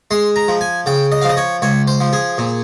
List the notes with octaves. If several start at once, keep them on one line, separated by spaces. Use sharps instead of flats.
G#3 C6
A#5
F3
G#5
C#3 G5
D#5
F5
F3 D#5
C#5
C#2 C#5
C5
F3
G#4
A#2